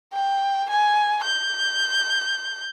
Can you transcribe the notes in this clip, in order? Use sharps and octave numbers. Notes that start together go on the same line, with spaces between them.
G5
G#5
G6